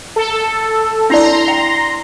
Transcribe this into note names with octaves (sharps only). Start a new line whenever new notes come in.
A4
D4 E4 D5 A#5 C6
G5